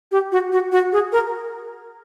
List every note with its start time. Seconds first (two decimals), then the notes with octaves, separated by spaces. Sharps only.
0.12 G4
0.32 F#4
0.52 F#4
0.72 F#4
0.92 G#4
1.12 A#4